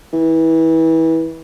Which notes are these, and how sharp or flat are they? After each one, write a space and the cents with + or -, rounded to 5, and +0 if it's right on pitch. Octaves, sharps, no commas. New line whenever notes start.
E3 -25